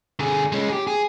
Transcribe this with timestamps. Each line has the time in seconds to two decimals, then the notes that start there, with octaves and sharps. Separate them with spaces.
0.19 D3 G#4
0.52 G#3 C#4
0.69 G4 G#4
0.87 G#4